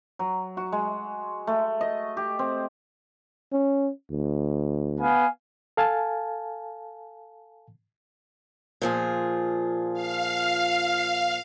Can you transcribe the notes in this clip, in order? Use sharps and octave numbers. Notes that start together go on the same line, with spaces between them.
F#3
F#4
G#3
A3
D#5
G4
C4
C#4
D2
B3 F5 G#5
A4 F5 G#5 A5
A#2 F3 G#4
F5